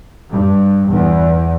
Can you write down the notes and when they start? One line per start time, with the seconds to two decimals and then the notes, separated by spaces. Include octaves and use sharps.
0.32 G2
0.90 E2